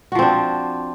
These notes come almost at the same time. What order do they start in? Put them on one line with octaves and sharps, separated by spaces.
F#4 F3 C4 D4